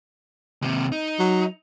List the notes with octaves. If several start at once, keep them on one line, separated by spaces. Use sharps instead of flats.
D#2 C3
D#4
F#3